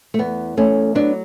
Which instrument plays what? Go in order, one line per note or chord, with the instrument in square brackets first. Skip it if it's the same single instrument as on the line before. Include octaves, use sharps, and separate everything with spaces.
[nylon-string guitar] A3
E2 B3
E2 A3 C#4
F#3 B3 D4